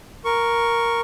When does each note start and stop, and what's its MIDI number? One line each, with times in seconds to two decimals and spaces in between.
0.25 1.01 70
0.25 1.01 85